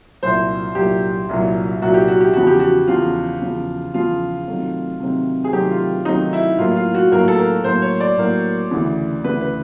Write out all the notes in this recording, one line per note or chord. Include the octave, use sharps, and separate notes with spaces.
C2 A#2 F#3 C5
C2 A#2 F#3 G4
C2 A#2 F#3
C2 A#2 F#3 F#4
G4
F#4
G4
E2 C#3 F3 F#4
G4
F#4
E2 C#3 F3 F4
E2 C#3 F3
E2 C#3 F3 F4
C3 D#3 F#3 A3 C4
C3 D#3 F#3 A3 C4
G#4
C3 D#3 F#3 A3 C4 G4
F4
C3 D#3 F#3 A3 C4 D#4
E4
A2 F#3 A#3 F4
F4
F#4
A2 F#3 A#3 A#4
A4
A#4
A2 F#3 A#3 C5
C#5
D5
A2 F#3 A#3
D2 C#3 E3
D2 C#3 E3 B4
B4